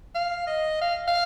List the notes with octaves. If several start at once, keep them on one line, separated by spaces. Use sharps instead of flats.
F5
D#5
F5
F5